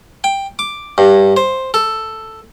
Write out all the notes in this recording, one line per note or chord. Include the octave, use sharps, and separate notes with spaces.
G5
D6
G2
C5
A4